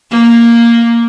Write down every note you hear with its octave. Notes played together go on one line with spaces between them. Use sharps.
A#3